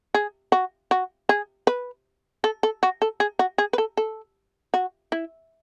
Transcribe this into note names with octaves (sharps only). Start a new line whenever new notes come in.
G#4
F#4
F#4
G#4
B4
A4
A4
F#4
A4
G#4
F#4
G#4
B4
A4
A4
F#4
E4